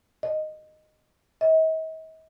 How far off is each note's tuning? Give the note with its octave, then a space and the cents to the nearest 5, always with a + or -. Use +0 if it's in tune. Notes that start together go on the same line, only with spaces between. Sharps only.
D#5 -10
D#5 +45